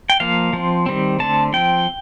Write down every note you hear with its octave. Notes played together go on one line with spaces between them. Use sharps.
G5
F3 A#3 F5
F3 C4
D#3 G3 C4
D3 A3 C4 A5
F3 C4 G5